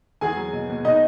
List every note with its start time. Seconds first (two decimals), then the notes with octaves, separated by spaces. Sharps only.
0.21 E2 G#4 G#5
0.37 F#3
0.53 B2
0.70 B2
0.84 B2 D#4 D#5